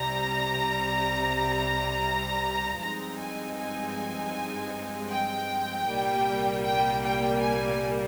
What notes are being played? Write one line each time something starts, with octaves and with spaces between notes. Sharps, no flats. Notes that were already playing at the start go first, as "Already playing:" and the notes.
Already playing: C2 C3 G3 A#5
G2 F3 G#3 C4 D#4 A#5
G#5
G#5
G5
C2 A#2 G3 A#3
G5
G5
G#5